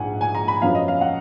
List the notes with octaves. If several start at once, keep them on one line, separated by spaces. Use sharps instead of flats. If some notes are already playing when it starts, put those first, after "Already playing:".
Already playing: A#1 G#2 F#5 G#5
G#5
A#5
B5
F#2 F3 B3 F5
D#5
F5
F#5